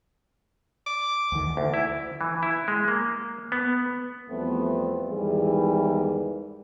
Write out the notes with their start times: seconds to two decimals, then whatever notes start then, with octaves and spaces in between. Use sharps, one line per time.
0.87 D6
1.32 D2 D#3
1.57 D2
1.74 E4
2.21 E3
2.43 E4
2.68 G#3
2.88 A#3
3.52 B3
4.29 E2 F3 G3 A3 B3 C4
5.10 E2 G#2 D#3 E3 G3 G#4